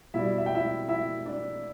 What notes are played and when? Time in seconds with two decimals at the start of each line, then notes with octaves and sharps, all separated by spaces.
0.14 B2 G3 E4 E5
0.38 E5
0.46 G5
0.55 E4 E5
0.88 E4 E5
1.26 D4 D5